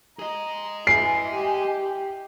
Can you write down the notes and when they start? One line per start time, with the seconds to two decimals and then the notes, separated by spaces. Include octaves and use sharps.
0.19 G#4 D#5 A#5
0.87 E3 G#5 C7
1.34 G4